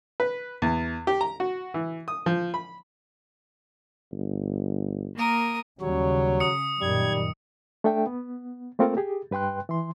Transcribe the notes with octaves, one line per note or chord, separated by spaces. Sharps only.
B4
E2
G4
A#5
F#4
E3
D#6
F3
B5
G1
A#3 A#4 D#6
D#2 C#3 F#3 G3 C#5
D#6 C#7
F#2 A#2 D#3 G3 G#6
A3 D4 A4 E5 G5
B3
A3 A#3 C4 F4 A4 A#4
G4 G#4
G2 B4 G5 C6 F#6
E3 C6